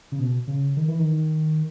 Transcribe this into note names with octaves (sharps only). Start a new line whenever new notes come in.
C#3
B2
C#3
D#3
E3
D#3